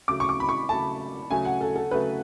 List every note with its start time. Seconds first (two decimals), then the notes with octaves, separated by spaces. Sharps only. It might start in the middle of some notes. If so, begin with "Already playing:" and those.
0.08 C#3 F#3 A3 D6
0.20 C#6
0.29 D6
0.40 B5
0.49 C#6
0.69 C#3 F#3 A3 A5
1.31 C#3 F#3 A3 G#5
1.45 F#5
1.61 A4
1.76 A4
1.91 C#3 F#3 A3 B4